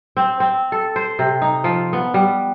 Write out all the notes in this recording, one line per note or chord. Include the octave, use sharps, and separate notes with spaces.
C4
C4
A4
C5
C3
D#4
F3
B3
G3